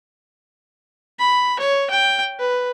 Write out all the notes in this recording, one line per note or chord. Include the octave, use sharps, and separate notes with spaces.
B5
C#5
G5
B4